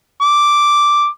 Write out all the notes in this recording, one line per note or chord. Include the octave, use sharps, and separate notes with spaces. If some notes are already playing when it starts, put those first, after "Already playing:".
D6